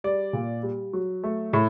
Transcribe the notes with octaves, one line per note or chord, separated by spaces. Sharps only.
G3 D5
A#2
G3
F#3
A3
A2